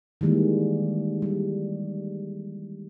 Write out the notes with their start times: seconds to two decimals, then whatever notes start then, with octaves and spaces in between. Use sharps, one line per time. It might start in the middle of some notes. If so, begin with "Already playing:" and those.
0.21 D#3 E3 G3 G#3 A#3
1.22 G3